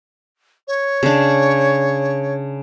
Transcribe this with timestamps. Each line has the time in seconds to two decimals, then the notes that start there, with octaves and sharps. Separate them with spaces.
0.67 C#5
1.03 C#3 D4